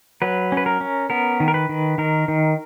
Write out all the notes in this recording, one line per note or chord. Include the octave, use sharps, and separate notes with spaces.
F#3 B4
C#4
B4
A#4
C#4
B3 A#4
D#3
A#4
B4
D#3
D#3 A#4
D#3